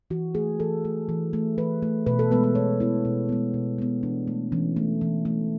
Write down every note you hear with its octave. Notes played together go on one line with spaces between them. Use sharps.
E3 F#4
A3 G#4
E3 A4
A3
E3
A3
E3 B4
A3
B2 B4
A4
G#3 B3 B4
B4
B2 C#5
G#3 B3 E4
B2
G#3 B3
B2
G#3 B3
E3 D4
A3
E3 C#4
A3
E3
A3